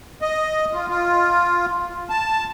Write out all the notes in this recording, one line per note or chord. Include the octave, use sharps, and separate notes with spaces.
D#5
F4
F4
A5